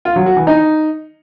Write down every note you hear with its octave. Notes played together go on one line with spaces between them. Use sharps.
F4
F#3
F#4
E3
D#4